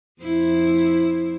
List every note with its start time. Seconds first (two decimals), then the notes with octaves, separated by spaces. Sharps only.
0.22 F2 E4 C5